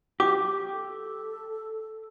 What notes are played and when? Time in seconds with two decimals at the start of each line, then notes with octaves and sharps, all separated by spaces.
0.20 G4 D6
0.71 A4